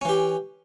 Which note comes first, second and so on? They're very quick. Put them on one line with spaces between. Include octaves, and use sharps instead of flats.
C#4 E3 G4